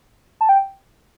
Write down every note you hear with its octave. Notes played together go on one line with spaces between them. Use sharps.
A5
G5